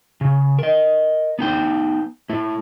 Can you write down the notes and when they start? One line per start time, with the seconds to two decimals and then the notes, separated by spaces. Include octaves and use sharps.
0.21 C#3
0.59 A#4 D#5
1.39 B3 D#4 G5
2.29 A3 E4